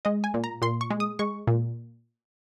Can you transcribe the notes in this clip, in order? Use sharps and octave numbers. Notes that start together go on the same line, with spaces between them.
G#3 D#5
G#5
A#2
A#5
A#2 C6
C#6
G#3
D#6
G#3 C#6
A#2